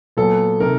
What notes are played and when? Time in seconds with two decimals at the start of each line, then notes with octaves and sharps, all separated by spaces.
0.17 A#2 F#3 B3 A4
0.60 C3 D#3 A#4